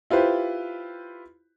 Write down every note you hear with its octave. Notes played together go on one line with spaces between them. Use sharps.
E4 F4 G4 B4 C5